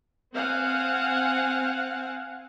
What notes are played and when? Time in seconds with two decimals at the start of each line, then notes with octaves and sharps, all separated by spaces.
0.35 C4 F5 F#5 G#5